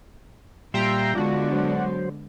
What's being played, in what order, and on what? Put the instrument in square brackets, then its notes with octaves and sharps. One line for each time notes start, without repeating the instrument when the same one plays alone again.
[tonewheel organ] A#2 G3 C6 [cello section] F4 [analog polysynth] E5 G5 A#5
[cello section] D3 G#3 B3 [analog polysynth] D4 F#4 [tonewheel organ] F4
[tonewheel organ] F#3 C5